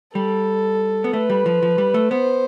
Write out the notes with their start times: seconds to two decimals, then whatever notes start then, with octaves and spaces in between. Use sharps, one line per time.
0.15 G3 A4
1.04 B3
1.13 A3 B4
1.30 G3
1.46 F3
1.63 F3
1.78 G3
1.94 A3
2.11 B3 C5